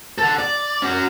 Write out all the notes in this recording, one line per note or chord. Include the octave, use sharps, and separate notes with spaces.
A4 F#5
D5
C#4 F#4